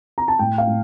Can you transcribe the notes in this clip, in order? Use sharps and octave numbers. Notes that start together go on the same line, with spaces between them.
A#5
A5
A2 G5
F5
A2